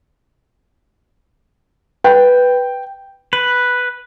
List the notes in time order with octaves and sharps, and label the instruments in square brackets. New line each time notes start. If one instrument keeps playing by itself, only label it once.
[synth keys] B4 [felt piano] G5
[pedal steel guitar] B4